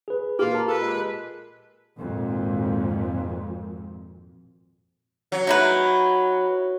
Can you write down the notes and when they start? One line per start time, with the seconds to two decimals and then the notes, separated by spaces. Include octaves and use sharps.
0.08 G#4 B4
0.39 A#2 A#3 F4 G4
0.53 A#4 A5 A#5
0.68 A4 B4
0.81 G#3
1.97 G#1 F2 A#2
5.32 F#3
5.47 D#4 E4 B4